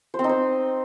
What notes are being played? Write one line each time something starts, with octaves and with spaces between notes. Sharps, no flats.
C5
C4
D#4
C5